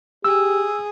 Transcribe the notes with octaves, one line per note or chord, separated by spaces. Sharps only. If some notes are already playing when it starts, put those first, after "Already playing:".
G4 G#4 E6